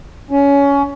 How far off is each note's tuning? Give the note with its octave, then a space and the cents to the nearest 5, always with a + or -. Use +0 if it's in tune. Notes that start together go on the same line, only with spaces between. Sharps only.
C#4 +20